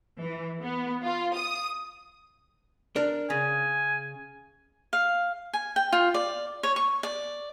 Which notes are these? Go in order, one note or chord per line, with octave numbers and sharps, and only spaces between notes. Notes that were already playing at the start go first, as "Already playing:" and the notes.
E3
B3
F4
D#6
D4 A#4
C#3 G#5
F5
G#5
G5
F4
D5
C#5
C#6
D5